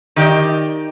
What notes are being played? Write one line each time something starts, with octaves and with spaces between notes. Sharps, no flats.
D#3 G4 D5 D#5